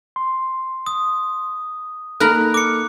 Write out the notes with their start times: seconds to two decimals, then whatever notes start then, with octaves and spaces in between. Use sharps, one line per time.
0.16 C6
0.86 D#6
2.20 A#3 D#4 A4 A#4 A#5 B5 F#6
2.54 D6 C#7